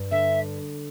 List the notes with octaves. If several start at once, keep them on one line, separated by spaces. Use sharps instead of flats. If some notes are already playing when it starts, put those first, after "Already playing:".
Already playing: G2 D4
D3 E5